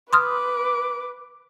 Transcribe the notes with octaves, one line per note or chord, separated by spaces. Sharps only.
B4 C6 D6 D#6 F6